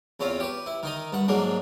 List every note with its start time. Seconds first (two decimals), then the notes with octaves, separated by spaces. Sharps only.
0.20 E2 C4 C#4 F4
0.40 G4 B4
0.66 E4
0.83 D#3 D#4 D#5
1.12 G2 F#5
1.28 G#2 F#3 G#3 A#3 D4